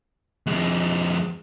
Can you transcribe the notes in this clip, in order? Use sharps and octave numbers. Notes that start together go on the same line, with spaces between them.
F2 G#3